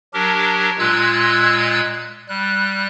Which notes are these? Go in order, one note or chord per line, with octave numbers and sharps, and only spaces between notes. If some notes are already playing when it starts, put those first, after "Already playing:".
F#3 D4 G4 A#4
A#2 G#3 F4 E6 F#6 G#6
G3 F#6